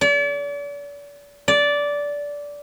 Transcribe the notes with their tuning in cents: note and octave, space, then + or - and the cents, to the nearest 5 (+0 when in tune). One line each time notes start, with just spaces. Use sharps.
D5 -40
D5 -15